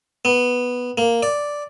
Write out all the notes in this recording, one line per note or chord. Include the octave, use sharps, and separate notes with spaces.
B3
A#3
D5